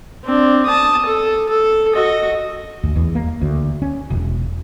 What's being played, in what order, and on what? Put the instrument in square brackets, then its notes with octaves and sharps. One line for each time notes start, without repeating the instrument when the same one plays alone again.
[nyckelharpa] C4 D4
A5 D#6
A4
A4
F#4 D#5
[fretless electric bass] D2
E2
A#3
D2
C#4
E1